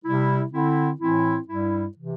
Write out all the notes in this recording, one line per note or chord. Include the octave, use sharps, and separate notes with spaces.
C3 G3 E4
D3 C4 E4
A2 E3 C4 E4
G2 G3 E4
C3 E3